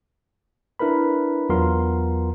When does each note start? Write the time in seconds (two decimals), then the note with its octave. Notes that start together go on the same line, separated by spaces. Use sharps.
0.79 D4 E4 A#4 B4 B5
1.49 E2 F#3 B3 F4 A#4 C6